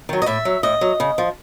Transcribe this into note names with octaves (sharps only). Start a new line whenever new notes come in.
D#3 F#3
D#5
A2 E5
F#3
A2 D#5
F#3
C#3
F3